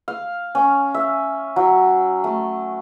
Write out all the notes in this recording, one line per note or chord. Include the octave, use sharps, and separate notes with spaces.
F5
C#4
E5
F#3
A3